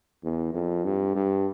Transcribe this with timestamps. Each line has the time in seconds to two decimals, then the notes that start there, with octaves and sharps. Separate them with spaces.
0.24 E2
0.54 F2
0.85 G2
1.15 G2